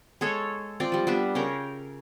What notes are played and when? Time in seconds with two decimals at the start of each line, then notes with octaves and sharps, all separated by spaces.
0.21 G#3 G#4 A4 C#5
0.80 C4 F4 D5
0.92 F3 G3
1.07 G3 B3 D4 E5
1.35 C#3 C#4 A#4 G5